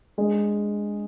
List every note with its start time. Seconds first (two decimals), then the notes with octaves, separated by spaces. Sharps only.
0.18 G#3 D4 G#4